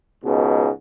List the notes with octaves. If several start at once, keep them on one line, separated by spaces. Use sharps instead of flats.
C#2 G#2 B2